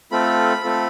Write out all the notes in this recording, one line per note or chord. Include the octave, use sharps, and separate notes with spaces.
A3 C4 F4 A4 B5
A3 C4 F4 A4